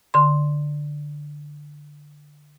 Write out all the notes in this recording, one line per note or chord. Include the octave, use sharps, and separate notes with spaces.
D3 C6